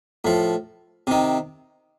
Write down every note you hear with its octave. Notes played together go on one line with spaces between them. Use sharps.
A2 F3
C3 D#3